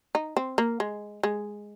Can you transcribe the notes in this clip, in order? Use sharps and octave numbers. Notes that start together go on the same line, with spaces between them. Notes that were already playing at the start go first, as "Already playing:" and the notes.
D#4
C4
A#3
G#3
G#3